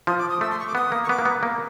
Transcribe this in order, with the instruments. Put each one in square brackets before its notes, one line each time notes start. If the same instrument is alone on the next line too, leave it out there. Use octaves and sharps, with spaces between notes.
[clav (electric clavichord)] F3 [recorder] D#6
[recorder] D6
D#6
[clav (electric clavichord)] A3 [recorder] E6
[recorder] C6
C#6
D6
[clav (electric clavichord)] B3 [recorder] D#6
[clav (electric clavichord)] A#3
[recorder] C#6
[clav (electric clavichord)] B3 [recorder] D6
[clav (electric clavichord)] A#3
B3
A#3